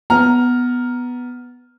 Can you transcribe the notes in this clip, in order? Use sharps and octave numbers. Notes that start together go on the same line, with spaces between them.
B3 A#5 F6